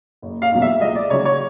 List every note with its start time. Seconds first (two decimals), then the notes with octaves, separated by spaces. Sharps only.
0.22 F#1
0.42 F5
0.52 E2 B2 F#3
0.62 E5
0.81 C#2 D#5
0.95 D5
1.10 C#3 F#3 C#5
1.25 C#5